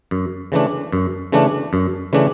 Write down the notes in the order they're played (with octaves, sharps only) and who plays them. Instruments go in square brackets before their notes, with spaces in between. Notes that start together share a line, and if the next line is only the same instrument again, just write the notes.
[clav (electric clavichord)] F#2
C#3 E3 A3 D4
F#2
C#3 E3 A3 D4
F#2
C#3 E3 A3 D4